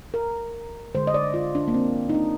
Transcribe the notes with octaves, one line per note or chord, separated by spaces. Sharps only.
A#4
D3 G#3 C5
D#5
D5
F4
D4
A#3
C4
D#4
D4